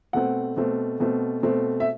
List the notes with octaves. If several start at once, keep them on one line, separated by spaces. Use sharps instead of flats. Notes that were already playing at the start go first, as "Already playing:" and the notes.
B2 A3 C4 F#5
B2 A3 C4
B2 A3 C4
B2 A3 C4
E5